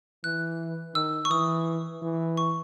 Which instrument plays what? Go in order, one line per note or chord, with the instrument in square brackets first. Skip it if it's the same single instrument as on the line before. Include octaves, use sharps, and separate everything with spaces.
[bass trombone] E3 [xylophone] F#6
[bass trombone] D#3 [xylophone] E6
[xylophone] C#6
[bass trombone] E3 [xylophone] D#6
[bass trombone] E3
[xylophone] C#6